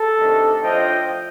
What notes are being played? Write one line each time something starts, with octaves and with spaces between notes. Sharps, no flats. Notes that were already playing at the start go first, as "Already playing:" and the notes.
Already playing: A4
C3 D#3 A3 D4
A2 F3 A3 D4 F4 D#5 G5